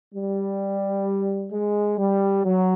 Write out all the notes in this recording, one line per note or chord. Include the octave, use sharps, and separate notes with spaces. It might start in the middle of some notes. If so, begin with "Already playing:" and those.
G3
G#3
G3
F#3